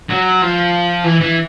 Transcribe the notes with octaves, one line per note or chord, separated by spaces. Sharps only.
F#3
F3
E3
E3